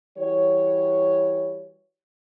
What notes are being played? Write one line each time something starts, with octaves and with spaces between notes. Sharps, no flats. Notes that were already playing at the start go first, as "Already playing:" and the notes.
E3 G3 F#4 C#5